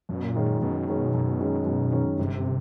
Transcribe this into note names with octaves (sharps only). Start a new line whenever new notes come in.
F#2 A#2
B2
A#2
D#3 G#3 C#4
F#2 B2
D#3 G#3 C#4
F#2
D#3 G#3 C#4
F#2
D#3 G#3 C#4
G1 C3